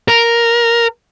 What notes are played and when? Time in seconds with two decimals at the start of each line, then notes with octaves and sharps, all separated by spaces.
0.08 A#4